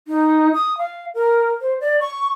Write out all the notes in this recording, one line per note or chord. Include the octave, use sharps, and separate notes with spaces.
D#4
D#6
F5
A#4
C5
D5
C#6